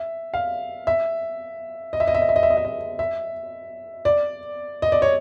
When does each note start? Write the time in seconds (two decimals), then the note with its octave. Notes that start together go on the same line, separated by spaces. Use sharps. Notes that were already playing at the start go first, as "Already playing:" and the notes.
Already playing: E5
0.34 F5
0.87 E5
1.93 D#5
2.00 E5
2.08 D#5
2.15 E5
2.22 D#5
2.29 E5
2.36 D#5
2.43 E5
2.50 D#5
2.57 E5
2.65 D#5
2.99 E5
4.05 D5
4.82 D#5
4.92 D5
5.02 C#5